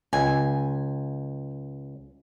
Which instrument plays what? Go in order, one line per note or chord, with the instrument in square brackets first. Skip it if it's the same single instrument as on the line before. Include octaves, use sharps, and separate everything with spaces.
[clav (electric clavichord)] C#2 [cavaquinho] G#5